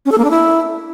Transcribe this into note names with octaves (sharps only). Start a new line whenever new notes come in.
C#4
A4
A#3
D4
E4